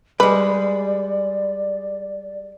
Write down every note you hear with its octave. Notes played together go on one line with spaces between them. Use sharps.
G3 G#3 B4 D5